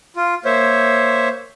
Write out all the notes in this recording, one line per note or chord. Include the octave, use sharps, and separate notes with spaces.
F4
A#3 C5 C#5 E5